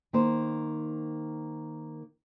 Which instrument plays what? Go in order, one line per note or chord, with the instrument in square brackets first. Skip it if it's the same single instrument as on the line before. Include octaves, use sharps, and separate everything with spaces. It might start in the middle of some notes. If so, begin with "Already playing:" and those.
[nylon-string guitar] D#3 A#3 C5